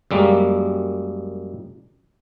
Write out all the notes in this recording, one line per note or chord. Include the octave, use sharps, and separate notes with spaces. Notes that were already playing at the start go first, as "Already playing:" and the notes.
F#2 G3 G#3 A#3